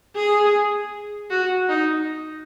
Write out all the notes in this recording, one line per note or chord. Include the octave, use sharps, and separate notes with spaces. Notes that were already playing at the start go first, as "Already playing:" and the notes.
G#4
F#4
D#4